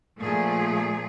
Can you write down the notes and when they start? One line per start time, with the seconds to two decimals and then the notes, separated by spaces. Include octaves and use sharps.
0.20 A#2 F3 A3 G#4